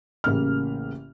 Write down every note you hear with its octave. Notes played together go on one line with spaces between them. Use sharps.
A1 C#3 A#3 F6